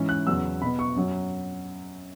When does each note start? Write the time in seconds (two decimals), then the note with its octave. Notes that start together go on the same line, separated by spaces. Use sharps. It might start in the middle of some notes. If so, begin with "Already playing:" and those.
Already playing: G#2 E3 C#4
0.09 F#6
0.27 E2 C#3 F#3 B3 E6
0.61 B2 B5
0.66 B3
0.79 C#6
0.96 F#2 F#3 C#4